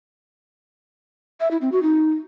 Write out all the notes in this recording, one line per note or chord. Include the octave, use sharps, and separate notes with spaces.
E5
E4
C4
F#4
D#4